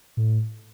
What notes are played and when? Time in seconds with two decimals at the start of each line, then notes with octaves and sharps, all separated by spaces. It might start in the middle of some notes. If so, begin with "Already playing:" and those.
0.17 A2